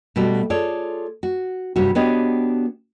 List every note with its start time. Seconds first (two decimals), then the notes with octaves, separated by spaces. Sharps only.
0.16 B2 G3 A3 F#4
0.50 F4 G#4 A4 C#5 D5
1.23 F#4
1.76 G2 C3 G3 C4 F#4
1.95 B3 D4 F#4 G4 C#5 D#5